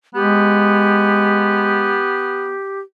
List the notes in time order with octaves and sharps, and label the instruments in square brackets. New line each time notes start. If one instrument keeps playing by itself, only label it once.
[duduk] G#3 [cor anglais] B3 [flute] G4